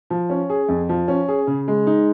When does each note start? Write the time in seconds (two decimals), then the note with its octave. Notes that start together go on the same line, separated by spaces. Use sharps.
0.10 F3
0.30 C#4
0.50 G#4
0.68 F2
0.89 F3
1.08 C#4
1.28 G#4
1.47 C#3
1.68 G#3
1.87 D#4